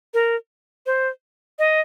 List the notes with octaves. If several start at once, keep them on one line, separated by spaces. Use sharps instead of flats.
A#4
C5
D#5